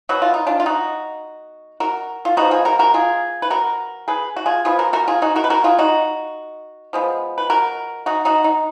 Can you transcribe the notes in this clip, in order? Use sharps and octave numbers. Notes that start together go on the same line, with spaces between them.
B2 F#3 B3 F#4
F4
D#4
D4 F4
F4
D#4 F#4
F#4 A#4
F4
F3 B3 D#4 F#4
F4 G#4
F#4 A#4
F#4 A#4
F4 G#4
B4
F#4 A#4
G#4 B4
F#4
F4 G#4
F3 B3 F4 G#4
F#4 A#4
F#4 A#4
F4 G#4
D#4 F#4
F#4 A#4
B4
F#4 A#4
F4 G#4
D#4 F#4
F3 G#3 B3
B4
F#4 A#4
D#4 F#4
D#4 F#4
D#4